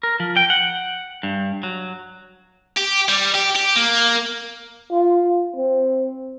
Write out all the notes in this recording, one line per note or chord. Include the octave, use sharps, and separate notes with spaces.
A#4
F3
G5
F#5
G2
F#3
G4
G3
G4
G4
A#3
F4
C4